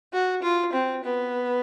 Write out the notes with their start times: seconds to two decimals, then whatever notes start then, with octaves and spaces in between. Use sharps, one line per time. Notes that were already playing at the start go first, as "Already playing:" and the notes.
0.13 F#4
0.42 F4
0.73 C4
1.04 B3